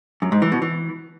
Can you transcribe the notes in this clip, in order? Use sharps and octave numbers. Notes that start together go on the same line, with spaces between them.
F#2
G#2
E3
B2
E3